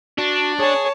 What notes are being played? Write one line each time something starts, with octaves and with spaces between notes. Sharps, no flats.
D4 F#4
G#4 C#5 G#5 A5